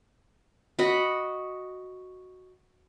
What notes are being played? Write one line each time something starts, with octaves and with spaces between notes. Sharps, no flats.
F#4 D#5 B5